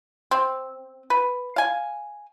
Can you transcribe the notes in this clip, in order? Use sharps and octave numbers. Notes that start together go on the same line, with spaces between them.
C4
B4
F5 G#5